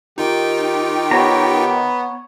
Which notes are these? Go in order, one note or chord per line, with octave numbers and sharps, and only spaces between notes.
D#3 D#4 F4 G4 G5
B3 C#5 A#5